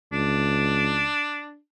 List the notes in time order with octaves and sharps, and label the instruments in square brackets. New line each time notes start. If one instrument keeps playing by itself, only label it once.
[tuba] C#2 [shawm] D4